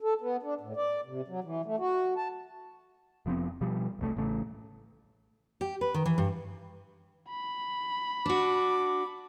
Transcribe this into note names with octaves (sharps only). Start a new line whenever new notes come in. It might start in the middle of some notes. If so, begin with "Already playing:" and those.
A4
B3
D4
A2
D5
C3
F#3
E3
A3
F#4
A5
F1 F3 B3 C4
B2 F3 G3
E1 C2 A3
A1 C#3 A3
G4
B4
D#3
E3
G2
B5
D4 F#4 D6